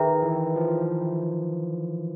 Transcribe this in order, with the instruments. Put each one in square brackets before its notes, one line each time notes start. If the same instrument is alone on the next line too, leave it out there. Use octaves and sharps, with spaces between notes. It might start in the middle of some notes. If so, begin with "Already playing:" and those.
Already playing: [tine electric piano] D#3 [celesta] G#4 B4 E5 G5 A#5
[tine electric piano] E3
F3